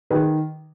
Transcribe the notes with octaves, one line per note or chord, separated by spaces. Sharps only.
D#3 G#4 B4